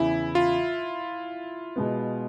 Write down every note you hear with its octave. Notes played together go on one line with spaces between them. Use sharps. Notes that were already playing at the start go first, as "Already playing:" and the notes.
Already playing: E2 C#3 E3 E4
F4
B2 G#3 B3